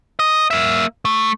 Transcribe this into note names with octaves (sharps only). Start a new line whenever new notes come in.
D#5
A#3 E5
A3